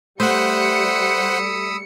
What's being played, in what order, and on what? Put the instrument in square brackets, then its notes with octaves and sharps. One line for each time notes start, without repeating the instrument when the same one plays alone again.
[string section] G3 C#7 [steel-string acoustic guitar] A3 [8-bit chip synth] C5 F#5 [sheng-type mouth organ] B5 D#6 E6